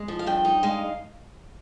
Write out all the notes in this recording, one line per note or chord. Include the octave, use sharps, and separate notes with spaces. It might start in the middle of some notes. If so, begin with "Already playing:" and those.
Already playing: G#3
F3
F5
G2 G5
D#4
G#3 F5